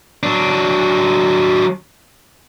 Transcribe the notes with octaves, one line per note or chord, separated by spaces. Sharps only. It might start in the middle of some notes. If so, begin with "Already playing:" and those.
F#3 D4